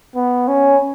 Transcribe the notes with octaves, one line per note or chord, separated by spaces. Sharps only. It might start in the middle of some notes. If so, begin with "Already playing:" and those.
B3
C#4